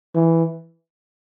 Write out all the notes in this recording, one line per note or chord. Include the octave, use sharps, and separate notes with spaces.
E3